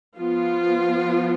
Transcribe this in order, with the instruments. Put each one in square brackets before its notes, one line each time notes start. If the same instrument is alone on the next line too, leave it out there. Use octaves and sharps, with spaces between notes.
[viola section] F3 B3 F4